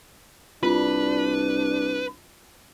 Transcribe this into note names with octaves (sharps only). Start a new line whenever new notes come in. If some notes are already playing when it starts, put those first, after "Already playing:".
C2 D4 F4 B4